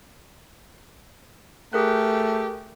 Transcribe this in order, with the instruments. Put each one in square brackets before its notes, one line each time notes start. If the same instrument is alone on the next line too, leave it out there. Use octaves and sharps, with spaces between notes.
[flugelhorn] A3 [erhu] G4 [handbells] G#4 A#4 F#6